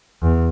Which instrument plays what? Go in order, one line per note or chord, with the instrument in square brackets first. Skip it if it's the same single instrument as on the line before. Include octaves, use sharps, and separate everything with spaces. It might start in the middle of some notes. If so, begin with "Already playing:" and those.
[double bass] E2